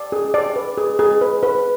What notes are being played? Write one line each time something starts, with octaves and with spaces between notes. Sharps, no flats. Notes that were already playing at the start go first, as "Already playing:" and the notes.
Already playing: D5
G#4
D5
B4
G#4
G#4
B4
B4